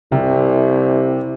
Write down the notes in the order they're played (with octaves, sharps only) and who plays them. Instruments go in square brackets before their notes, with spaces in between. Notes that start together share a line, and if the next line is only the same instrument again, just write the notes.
[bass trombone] C2 [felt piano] C3